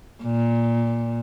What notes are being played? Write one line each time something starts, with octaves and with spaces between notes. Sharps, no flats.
A#2